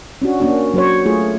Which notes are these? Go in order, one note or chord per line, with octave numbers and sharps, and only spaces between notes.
C#4 D4 F#4
A#3 C#4 D4 F#4
F#3 C5 C#5
A3 F4 G#4